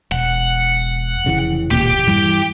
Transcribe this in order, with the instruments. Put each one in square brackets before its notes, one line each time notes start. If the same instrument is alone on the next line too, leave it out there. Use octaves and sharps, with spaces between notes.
[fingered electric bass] E1 [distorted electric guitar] F#5
[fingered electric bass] F1 C#3 E3
[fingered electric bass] E1 D#2 A#2 [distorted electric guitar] G4
[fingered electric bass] G2 E3 G3